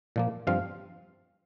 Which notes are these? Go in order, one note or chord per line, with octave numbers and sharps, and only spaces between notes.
A#2 F3 A#3
G2 F3 C4 F5